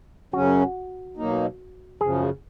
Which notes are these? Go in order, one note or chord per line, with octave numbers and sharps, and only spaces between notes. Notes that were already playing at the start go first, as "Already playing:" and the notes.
F#2 C#3 F#3 C#4 F#4
B2 F#3 A#3 D#4
F#2 C#3 F3 G#4